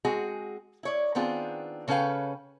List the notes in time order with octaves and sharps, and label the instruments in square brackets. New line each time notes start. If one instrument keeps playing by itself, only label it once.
[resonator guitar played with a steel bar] G#3 C4 F#4 G#4
E4 C#5 D5
D#3 B3 C4 D4 F4 G#4
C#3 C#4 A4 B4 F5 G5